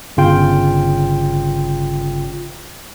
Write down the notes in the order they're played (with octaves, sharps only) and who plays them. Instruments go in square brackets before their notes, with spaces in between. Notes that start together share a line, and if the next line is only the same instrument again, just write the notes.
[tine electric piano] G1 C#3 F4 G5